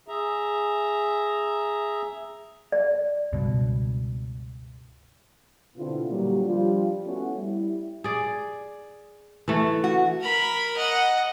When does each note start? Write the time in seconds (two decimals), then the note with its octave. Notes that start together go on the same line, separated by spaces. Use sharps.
0.08 G#4 E5 A#5
2.72 D5
3.33 C#2 G2 B2
5.76 B2 D3 B3 C4 E4 F4
6.09 A#2 D3 E3 F#3 G3
6.46 F3 G3 D4 F4
7.05 A3 B3 C#4 E4 F#4
7.35 G3 E4
8.04 G#4 D5
9.48 E3 A3
9.84 F#4
10.21 A#4 B5
10.77 D#5 F#5